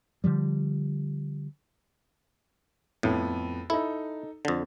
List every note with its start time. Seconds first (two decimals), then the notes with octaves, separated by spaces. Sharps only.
0.24 D3 D#3 F3 G3
3.03 F2 A2 B3
3.70 D#4 E4 A4
4.45 F2 D3